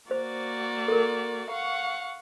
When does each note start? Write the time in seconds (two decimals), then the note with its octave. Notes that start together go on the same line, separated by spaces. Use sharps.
0.11 A#3 F#4 C5 D5
0.88 A4 A#4
1.51 F5 F#5 C#6